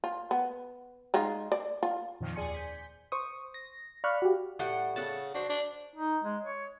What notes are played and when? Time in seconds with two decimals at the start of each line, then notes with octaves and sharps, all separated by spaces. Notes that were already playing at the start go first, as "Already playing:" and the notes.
0.04 F4
0.31 B3
1.14 G#3 D#4 F4
1.52 D5
1.83 F4
2.21 F2 A#2 D#3 F3
2.36 D#2 G#4 D5 G#5 C6 C#7
2.54 G6 B6
3.12 C5 C#6 D#6
3.54 A#6
4.04 D5 F5 B5 C#6 F6 F#6
4.22 F#4 G4
4.59 A2 G3 F#5 G5
4.96 C#3 A4 F#5 A5
5.35 D4 F#4 C5
5.49 D4
5.96 D#4
6.24 G#3
6.44 C#5